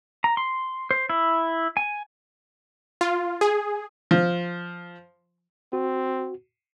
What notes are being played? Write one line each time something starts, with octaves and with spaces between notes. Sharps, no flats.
A#5
C6
C5
E4
G#5
F4
G#4
F3
C4 F#4